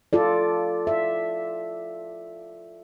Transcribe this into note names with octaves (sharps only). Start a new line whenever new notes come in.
F4 A4 D5
E5